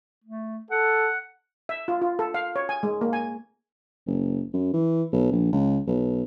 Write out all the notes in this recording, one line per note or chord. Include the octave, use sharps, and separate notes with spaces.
A3
A4 F#5
E5
F4
F4
A4
F5
C#5
G#5
G#3
A#3
G#5
F#1
F#2
E3
B1
A#1
C#2
B1